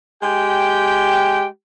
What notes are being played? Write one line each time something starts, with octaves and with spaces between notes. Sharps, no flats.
G#3 G4 G5